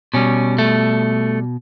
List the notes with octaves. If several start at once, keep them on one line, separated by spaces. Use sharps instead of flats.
B2 G3 C#4
A3